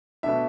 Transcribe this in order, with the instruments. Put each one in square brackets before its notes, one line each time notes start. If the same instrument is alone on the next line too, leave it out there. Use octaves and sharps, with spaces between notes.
[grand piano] B2 A3 D4 E5